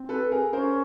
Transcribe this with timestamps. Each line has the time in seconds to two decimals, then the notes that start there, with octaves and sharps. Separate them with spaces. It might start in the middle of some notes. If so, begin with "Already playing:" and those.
Already playing: C4
0.09 A4 B4
0.32 G#4 A#4
0.53 C#4 A#4 C5